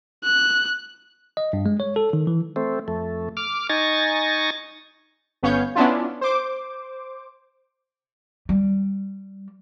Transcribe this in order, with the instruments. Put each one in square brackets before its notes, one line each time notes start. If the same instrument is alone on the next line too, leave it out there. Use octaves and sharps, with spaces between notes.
[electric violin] F#6
[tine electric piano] D#5
G2
G#3
C#5
A4
D#3
E3
[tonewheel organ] A3 C4
F2 A3
D6 F6
D#4 G#5 C#6 A6 A#6
[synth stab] G1 B3 C#4 C#5 F5 G6
B3 C#4 D4 E4 F4
C5 D6
[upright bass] G3